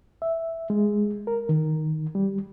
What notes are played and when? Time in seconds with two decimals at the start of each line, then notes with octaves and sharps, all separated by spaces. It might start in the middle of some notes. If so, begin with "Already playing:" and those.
0.22 E5
0.70 G#3
1.27 A#4
1.49 D#3
2.15 G3